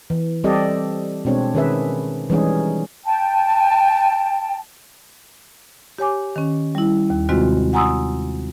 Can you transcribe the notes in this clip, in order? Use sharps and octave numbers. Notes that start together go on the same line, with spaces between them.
E3
G3 C4 G4 A4 D5 D#5
B2 G#3 C4 D4 C#5
D#3 C#4 G#4 B4 E5
E3 G3 G#3 C#4 D#4 G#4
G5 A5
G4 C#5 G#5 D6
D#3 C#4
G3 E4
D#2
C3 D#3 G#3 C4 F4 F#4
F#5 G#5 A#5 C6 D#6 E6